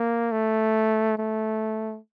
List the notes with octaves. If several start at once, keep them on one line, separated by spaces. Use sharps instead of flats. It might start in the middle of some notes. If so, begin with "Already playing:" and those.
Already playing: A#3
A3
A3